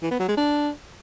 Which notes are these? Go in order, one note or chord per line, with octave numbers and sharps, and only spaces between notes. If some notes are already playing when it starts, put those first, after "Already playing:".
E3
B3
F#3
G#3
D4